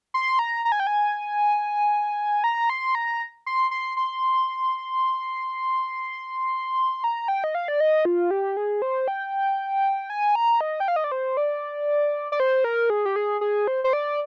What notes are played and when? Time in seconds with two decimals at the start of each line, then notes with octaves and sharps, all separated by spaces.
0.14 C6
0.39 A#5
0.65 A#5
0.72 G#5
0.80 G5
0.87 G#5
2.44 A#5
2.70 C6
2.95 A#5
3.46 C6
3.71 C6
3.97 C6
7.04 A#5
7.28 G5
7.44 D#5
7.55 F5
7.68 D5
7.80 D#5
8.05 F4
8.31 G4
8.57 G#4
8.82 C5
9.08 G5
10.10 G#5
10.35 A#5
10.61 D#5
10.80 G5
10.88 F5
10.96 D#5
11.04 D5
11.12 C5
11.37 D5
12.32 D5
12.40 C5
12.64 A#4
12.90 G#4
13.06 G4
13.16 G#4
13.41 G#4
13.67 C5
13.84 C5
13.93 D5